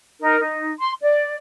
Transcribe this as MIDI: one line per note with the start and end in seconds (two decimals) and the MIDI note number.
0.20 0.40 63
0.20 0.40 70
0.40 0.74 63
0.79 0.93 84
1.02 1.37 74